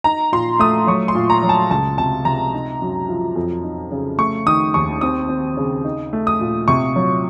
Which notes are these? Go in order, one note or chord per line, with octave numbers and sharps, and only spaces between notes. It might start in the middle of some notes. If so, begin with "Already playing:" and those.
D#4 A#5
A#2 C6
A3 D#6
F#3 C#6
C6
A#2
A#5
F#3
A5
C#2 A5
C3 A5
C3 A#5
D#4
F#2
F3
F2
D#4
C#3
A3 C#6
D#3 D#6
D#2 C#6
C4 D#6
C4
C#3
D#4
A3
D#6
A#2
C3 C#6
F#3